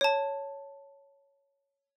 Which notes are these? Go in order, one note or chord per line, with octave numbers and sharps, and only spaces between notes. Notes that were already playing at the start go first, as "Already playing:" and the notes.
C#5 A5